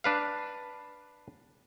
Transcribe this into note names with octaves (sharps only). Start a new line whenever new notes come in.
D4 B4 F5